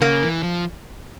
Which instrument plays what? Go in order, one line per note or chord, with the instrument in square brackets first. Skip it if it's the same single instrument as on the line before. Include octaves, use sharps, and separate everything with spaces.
[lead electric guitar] C#3 [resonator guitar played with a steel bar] A#3
[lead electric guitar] E3
F3